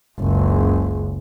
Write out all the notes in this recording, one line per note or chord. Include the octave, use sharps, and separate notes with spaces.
F#1 C#2